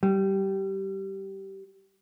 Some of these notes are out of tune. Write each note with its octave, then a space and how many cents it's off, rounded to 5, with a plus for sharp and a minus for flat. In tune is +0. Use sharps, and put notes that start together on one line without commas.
G3 -15